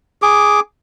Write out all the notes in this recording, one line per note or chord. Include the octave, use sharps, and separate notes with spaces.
G#4 D6